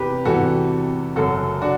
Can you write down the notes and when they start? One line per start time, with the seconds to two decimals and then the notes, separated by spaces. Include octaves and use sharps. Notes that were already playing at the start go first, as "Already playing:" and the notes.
Already playing: E2 C3 E3 G4 B4
0.25 E2 C3 E3 F#4 A4
1.16 F#1 F#2 F#3 F#4 A4
1.62 D4 F#4